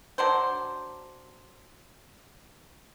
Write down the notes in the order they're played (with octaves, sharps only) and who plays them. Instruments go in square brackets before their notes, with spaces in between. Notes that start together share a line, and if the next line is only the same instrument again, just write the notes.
[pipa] F#3 D4 C5